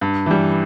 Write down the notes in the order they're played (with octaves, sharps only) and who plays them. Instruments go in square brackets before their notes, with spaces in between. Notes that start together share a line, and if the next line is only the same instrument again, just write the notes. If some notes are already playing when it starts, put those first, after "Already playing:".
[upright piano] G2
E3 G3